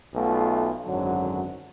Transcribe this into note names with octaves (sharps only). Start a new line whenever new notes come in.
B1 B2 A3 F4
G#1 F#2 D3 F#3